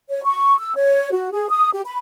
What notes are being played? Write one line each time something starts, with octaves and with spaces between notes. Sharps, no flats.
C#5
C#6
E6
C#5
F#4
G#4
D#6
G4
B5